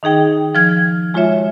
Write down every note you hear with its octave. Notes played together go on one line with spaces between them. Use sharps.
D#3 D#4 G#4 G5
F3 F6 G#6
G#3 F4 F#4 C#5 E5